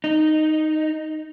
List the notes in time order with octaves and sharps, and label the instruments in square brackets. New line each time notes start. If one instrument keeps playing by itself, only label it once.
[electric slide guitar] D#4